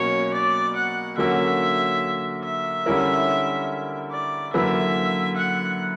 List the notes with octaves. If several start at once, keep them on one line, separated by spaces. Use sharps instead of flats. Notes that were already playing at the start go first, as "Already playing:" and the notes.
Already playing: B2 F#3 A#3 C#4 C#5
D5
F#5
D3 F#3 A#3 C#4 F#4 E5
E5
D3 G3 C#4 E4 A#4
D5
F#2 D3 A#3 E4 B4 E5
F#5